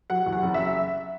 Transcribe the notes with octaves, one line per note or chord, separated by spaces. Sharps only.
F#3 F#5
E2
F#5
F#1
E5